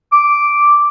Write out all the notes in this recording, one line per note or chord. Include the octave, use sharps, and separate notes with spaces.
D6